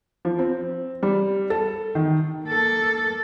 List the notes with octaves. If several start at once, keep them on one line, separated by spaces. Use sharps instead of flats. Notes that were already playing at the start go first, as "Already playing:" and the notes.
F3
C4
G3
A4
D#3
A#3 A4